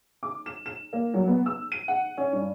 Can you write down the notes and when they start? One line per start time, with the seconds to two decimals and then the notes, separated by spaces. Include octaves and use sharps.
0.23 D6
0.46 E7
0.66 E7
0.93 A#3
1.14 F#3
1.28 B3
1.46 E6
1.72 D#7
1.88 F#5
2.17 C#4
2.33 G2